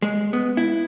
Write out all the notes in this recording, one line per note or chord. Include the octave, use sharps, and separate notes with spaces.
G#3
B3
E4